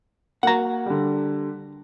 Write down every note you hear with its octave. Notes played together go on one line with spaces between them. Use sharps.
A#3 F#4 A#4 F#5 A#5
D3 G3